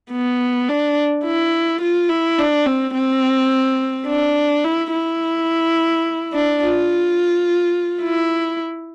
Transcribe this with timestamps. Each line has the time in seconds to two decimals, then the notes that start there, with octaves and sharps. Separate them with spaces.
0.12 B3
0.69 D4
1.25 E4
1.82 F4
2.09 E4
2.38 D4
2.66 C4
2.94 C4
4.07 D4
4.64 E4
4.92 E4
6.33 D4
6.62 F4
8.02 E4